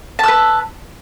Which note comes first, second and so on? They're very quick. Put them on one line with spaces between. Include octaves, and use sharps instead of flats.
A5 E6 B4